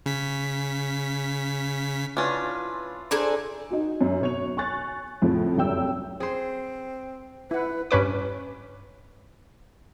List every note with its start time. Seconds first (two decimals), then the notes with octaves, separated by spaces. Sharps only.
0.06 C#3 B6
2.17 C#4 D4 E4 F4 B4
3.11 D4 G#4 A4 C5 A#5
3.71 D#4 F#4
4.01 F#2
4.21 B2 C#5 F7
4.57 G#5 C#6 F#6 A6
5.22 F2 A2 C#3 F3
5.56 F1 C2 F#2 G5 E6
6.20 C4 G#4 C5
7.51 E4 B4 F#5
7.91 G2 C#4 B4 D6